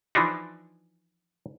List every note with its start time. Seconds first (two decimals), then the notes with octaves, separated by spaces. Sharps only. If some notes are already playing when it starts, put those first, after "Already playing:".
0.15 E3 F3 D4 D#4